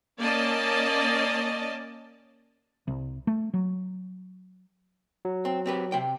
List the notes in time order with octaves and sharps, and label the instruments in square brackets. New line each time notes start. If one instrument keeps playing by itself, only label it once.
[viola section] A#3 C#4 D5 D#5 A5
[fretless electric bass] C2
A3
F#3
[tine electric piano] F#3
[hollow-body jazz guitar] C4
C4 G4 B4
C3 G5